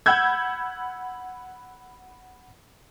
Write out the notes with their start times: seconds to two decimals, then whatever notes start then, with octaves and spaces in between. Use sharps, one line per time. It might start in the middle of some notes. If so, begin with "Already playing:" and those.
0.06 F#5 B5 E6 G6 G#6